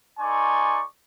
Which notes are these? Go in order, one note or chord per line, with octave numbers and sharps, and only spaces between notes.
D#4 A4 D5 G#5 C6 C#6